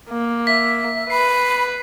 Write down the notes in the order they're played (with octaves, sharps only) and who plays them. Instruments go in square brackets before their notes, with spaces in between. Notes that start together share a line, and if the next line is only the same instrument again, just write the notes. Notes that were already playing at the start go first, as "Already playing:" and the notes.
[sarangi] A#3
[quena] E5 [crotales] B6
[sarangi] B4 [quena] B5 [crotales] C7